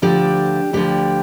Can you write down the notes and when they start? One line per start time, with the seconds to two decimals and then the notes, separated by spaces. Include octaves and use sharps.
0.02 D2 D3 F3 D4 G4
0.73 D2 D3 F3 D4 G4